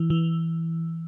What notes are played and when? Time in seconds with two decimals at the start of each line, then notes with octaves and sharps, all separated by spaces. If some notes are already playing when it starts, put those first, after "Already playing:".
Already playing: E3
0.10 E3